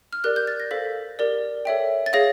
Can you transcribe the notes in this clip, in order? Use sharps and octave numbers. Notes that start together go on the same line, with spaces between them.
F6
G4 A#4 D5 F#6
G6
A6
A#6
A4 C5 F5 B6
G4 A#4 D5
A4 C#5 E5 G5
A6
G#4 C#5 F5 A#6